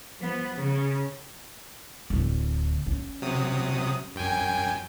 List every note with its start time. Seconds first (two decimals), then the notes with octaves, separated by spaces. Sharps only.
0.20 F3 B3
0.57 C#3
2.10 D1 D2
2.87 C#4
3.22 C3 F#3 D#6
4.15 F#2 G5 G#5